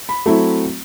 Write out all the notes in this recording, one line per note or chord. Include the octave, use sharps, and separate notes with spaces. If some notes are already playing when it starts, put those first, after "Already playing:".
B5
F#3 A3 C4 E4